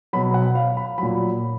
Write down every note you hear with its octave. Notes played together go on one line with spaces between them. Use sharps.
B2 F#3 B5
F#5
F5
B5
A#2 F#3 B5